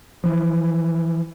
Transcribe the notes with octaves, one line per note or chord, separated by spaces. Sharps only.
E3 F3